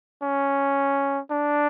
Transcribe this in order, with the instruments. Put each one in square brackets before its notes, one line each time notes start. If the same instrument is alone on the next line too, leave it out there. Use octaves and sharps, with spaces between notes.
[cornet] C#4
D4